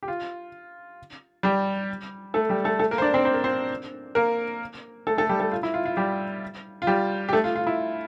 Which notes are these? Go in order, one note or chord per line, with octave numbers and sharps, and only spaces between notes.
G4
F4
G3 G4
A3 A4
G3 G4
A3 A4
A3 A4
A#3 A#4
C5
D4 D5
C4 C5
C5
A#4
C4 C5
A#3 A#4
A3 A4
A3 A4
G3 G4
A3 A4
F4
E4
F4
F4
G3 G4
F4
G3 G4
G4
A3 A4
F4
F4
E4